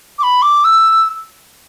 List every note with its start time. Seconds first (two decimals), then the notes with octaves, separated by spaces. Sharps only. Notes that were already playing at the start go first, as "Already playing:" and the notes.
0.19 D6
0.23 B5
0.42 D6
0.64 E6